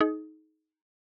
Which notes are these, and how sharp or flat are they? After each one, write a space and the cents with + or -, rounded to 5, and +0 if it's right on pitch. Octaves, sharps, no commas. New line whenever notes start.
D#4 +10 G#4 +40